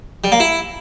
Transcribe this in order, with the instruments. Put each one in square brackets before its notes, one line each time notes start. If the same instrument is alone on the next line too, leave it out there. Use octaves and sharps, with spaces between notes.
[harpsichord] G3
A#3
E4